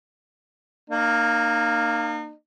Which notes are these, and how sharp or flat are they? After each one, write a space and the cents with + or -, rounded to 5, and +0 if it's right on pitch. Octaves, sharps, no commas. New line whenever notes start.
A#3 +0 D#4 -40